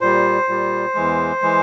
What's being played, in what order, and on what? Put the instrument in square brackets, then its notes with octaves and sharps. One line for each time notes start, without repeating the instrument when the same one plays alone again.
[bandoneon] A#2 G3 C5
A#2 G3
E2 E3 G#3
E3 G#3